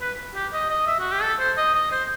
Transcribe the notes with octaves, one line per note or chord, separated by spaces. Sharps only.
B4
G4
D#5
D#5
E5
F#4
G4
A4
C5
D#5
D#5
C5